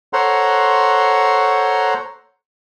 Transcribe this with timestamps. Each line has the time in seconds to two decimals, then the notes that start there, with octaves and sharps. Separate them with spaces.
0.13 A4 C5 C#5 F#5 A#5 C6